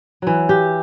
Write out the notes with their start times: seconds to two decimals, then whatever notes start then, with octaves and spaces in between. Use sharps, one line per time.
0.22 E3 F#3
0.49 G4